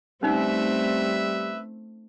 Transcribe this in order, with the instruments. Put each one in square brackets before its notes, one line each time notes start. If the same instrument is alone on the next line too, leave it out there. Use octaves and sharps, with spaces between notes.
[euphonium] G3 [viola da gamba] A3 C4 [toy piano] C#4 D#4 [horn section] B4 E5